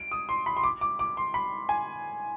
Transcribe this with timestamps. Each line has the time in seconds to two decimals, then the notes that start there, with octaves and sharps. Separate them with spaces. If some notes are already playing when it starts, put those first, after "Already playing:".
Already playing: D7
0.12 D#6
0.29 C6
0.46 B5
0.57 C6
0.63 D6
0.81 D6
0.99 D6
1.17 C6
1.34 B5
1.69 G#5